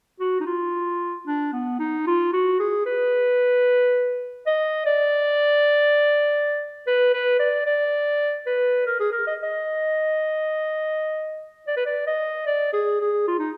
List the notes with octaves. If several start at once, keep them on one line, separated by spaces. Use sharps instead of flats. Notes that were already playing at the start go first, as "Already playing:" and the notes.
F#4
D#4
F4
D4
B3
D#4
F4
F#4
G#4
B4
D#5
D5
B4
B4
D5
D5
B4
A#4
G#4
A#4
D#5
D#5
D5
B4
D5
D#5
D5
G#4
G#4
F4
D#4